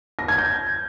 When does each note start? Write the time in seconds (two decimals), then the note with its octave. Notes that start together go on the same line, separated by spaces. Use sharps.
0.19 A#6
0.28 G#6
0.38 G6